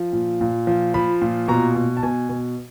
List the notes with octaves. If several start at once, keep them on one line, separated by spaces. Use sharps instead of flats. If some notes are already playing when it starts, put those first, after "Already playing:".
Already playing: F3
A#2
A#2
F3
F3 B5
A#2
B2 A#5
B2
A5
B2 G#5
B2